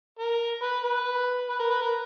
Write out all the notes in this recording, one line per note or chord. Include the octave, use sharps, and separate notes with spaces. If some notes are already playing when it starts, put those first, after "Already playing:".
A#4
B4
B4
B4
A#4
B4
A#4